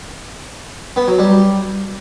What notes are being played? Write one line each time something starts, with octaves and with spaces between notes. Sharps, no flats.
B3
F#3
G3